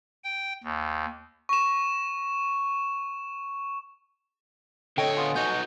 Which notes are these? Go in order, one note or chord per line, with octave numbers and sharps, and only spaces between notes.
G5
D#2
C#6 E7
D3 A4 C#5 D#5 G5
B3 F4 G#5 D#6
B2 B3 D#4 F#4 G6